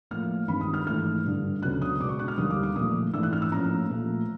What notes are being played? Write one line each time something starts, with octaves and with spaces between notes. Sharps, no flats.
A2 F3 A#3 F6
G2 D#3 G#3 C4 B5
D#6
F6
G#2 E3 A3 F6
G2 D3 G3
D2 C#3 F#3 B3 D4 F#6
D#6
B2 G#3 B3 D4 D6
C#6
F#6
F6
D#2 D3 G3 A#3 D#6
D6
D6
A#2 F3 A3 D#6
G#2 E3 A3 D4 E6
F#6
F6
E6
A2 F3 A#3 C#4 A#5
A#2 F3 A3